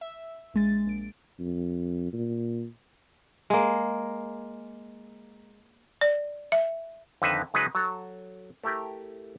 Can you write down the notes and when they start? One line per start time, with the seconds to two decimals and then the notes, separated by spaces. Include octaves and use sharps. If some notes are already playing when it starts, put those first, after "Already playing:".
0.01 E5
0.54 A#1 G#3 A6
0.86 A#1 D7
1.39 F2
2.13 A#2
3.50 G#3 A#3
6.01 D5
6.52 E5
7.22 F2 D3 D#3 D#4 B4 E5
7.54 C#3 F#3 G#3 D#4 B4
7.75 F#3 A4
8.64 A3 E4 G4 A#4